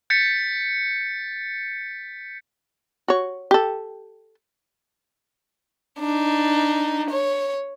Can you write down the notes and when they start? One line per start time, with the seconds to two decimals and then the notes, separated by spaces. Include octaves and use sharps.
0.10 G6 A6 B6 C#7
3.08 F#4 C#5
3.51 G4 A4
6.00 D4 D#4
7.10 C#5